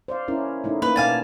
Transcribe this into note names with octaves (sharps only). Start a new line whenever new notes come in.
C5 D5 F5
C#4 E4 A#4
A3 D#4 E4
A#3 B4
B2 B3 D5 F5 G#5 A5